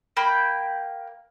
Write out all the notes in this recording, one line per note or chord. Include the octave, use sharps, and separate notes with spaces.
A#3 G5 B5